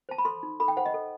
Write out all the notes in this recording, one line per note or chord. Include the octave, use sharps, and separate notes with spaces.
C5 A5
B5
A4 C6
D#4
A4 B5
G5
C5 F#5
D#5
A4